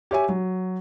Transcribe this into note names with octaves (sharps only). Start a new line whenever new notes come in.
G4 C#5 E5 G#5
F#3